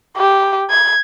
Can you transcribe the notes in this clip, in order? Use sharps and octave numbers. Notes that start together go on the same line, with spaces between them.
G4
G#6